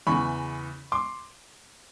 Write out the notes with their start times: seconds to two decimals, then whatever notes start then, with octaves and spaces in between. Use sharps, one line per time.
0.07 E2 C#3 E3 B5 C#6
0.92 C6 D6